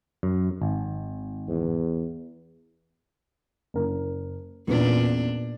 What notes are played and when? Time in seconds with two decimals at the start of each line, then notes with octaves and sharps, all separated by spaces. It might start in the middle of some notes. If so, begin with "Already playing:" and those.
0.23 F#2
0.62 G#1
1.48 E2
3.74 F#1 A#4
4.67 E2 A#2 C#4 D4 B4